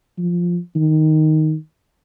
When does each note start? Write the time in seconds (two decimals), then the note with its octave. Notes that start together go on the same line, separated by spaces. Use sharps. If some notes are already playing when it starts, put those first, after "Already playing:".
0.18 F3
0.75 D#3